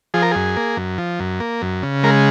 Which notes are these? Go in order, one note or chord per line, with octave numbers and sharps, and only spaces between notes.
F3 G#4
A#4
F#2 G#4
A#3
F#2
F3
F#2
A#3
F#2
C#3
G#3 A#4